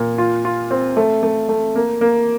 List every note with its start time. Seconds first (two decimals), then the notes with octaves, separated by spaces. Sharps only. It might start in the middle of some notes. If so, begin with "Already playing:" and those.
Already playing: A#2
0.18 F4
0.45 F4
0.71 C4
0.97 A3
1.23 A3
1.49 A3
1.75 A#3
2.01 A#3